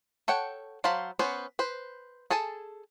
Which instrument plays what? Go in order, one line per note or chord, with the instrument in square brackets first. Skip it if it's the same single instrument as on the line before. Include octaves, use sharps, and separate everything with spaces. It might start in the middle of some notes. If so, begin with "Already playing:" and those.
[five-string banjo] A4 C#5 F#5 G5
F#3 C5 F5 A5 B5
B3 C#4 B4 C5
B4 C5
G#4 A4 G#5 A5